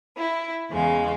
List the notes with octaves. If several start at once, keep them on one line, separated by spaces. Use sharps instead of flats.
E4
E2 C#3 G#3 F5